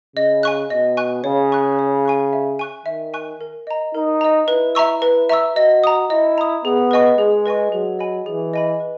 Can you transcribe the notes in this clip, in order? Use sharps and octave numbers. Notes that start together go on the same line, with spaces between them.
C#3 D#5
G#5 C#6 F#6
B2 D#5
G#5 C#6 F#6
C#3 C#5
G#5 C#6 F#6
C#5
G#5 C#6 F#6
E5
G#5 C#6 F#6
D#3 E5
G#5 C#6 F#6
A#4
D#5 A#5
D#4 A#4
D#5 A#5
E4 B4
E5 A#5 C#6 E6
B4
E5 A#5 C#6 E6
F#4 D#5
A#5 D#6
E4 D#5
A#5 D#6
B3 G#4
B4 D#5 G#5 C#6
G#3 G#4
B4 D#5 G#5 C#6
F#3 G#4
D#5 G#5 B5
E3 G#4
D#5 G#5 B5
B4